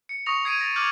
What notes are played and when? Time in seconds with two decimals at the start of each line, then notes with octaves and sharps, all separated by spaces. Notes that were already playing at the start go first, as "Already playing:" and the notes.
0.09 C#7
0.26 C#6 D#6 A#6 C#7 F7
0.44 D#6 G#6 C7 D7 D#7
0.60 A6 A#6 D#7
0.76 D6 F6 G6 F7 F#7